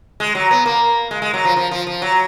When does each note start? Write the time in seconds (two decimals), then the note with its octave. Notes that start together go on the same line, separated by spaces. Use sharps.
0.20 G#3
0.35 F#3
0.51 B3
0.66 A#3
1.11 G#3
1.22 G#3
1.33 F#3
1.45 F3
1.56 F3
1.71 F3
1.87 F3
2.02 F#3